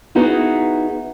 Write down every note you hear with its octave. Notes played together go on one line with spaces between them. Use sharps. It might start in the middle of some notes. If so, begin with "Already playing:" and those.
B3 D#4 E4 F#4 G#4 B4